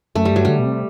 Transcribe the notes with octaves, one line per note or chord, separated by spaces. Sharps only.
F#2 A3
G3
G2 F#3
D3 G3
B2
C3